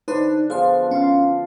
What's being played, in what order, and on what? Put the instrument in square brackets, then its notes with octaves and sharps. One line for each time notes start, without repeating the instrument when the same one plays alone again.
[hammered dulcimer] D3 D4 [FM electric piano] D#4 B4 C5
[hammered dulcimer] B2 F3 F4 [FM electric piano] G#4 C5
[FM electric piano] C#4 [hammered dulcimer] F5 C6